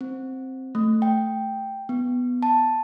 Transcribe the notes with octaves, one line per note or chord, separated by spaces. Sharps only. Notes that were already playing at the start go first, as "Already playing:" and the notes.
C4
A3
G5
B3
A5